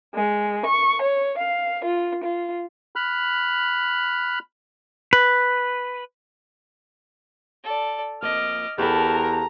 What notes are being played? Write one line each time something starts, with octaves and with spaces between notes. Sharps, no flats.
G#3
C#6
C#5
F5
F4
F4
B5 F6 F#6
B4
A4 D5
F2 A#3 D#5 D6 F6
E2 G4 A4 A#4 A5 B5
A#5